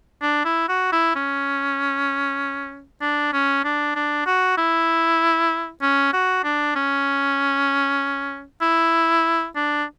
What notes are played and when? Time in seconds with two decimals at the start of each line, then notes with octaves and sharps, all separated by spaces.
0.22 D4
0.45 E4
0.69 F#4
0.92 E4
1.16 C#4
3.01 D4
3.33 C#4
3.64 D4
3.96 D4
4.26 F#4
4.58 E4
5.82 C#4
6.13 F#4
6.44 D4
6.75 C#4
8.62 E4
9.56 D4